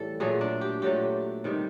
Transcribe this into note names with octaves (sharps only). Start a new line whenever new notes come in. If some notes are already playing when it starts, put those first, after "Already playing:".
Already playing: A2 E3 G3 A4
A#2 F#3 A3 G#4
D4
G4
A#2 F#3 A3 G4
C3 D#3 G3